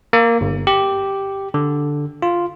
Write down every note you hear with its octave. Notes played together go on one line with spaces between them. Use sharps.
A#3
G1
G4
D3
F4